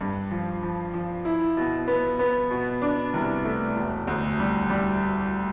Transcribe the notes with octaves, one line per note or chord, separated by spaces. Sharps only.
G2
F3
F3
F3
E4
B2
B3
B3
B2
D4
C2
A3
E1
D2
G3
G3